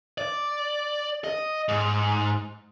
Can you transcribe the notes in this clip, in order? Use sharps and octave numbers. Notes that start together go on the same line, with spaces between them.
D5
D#5
G#2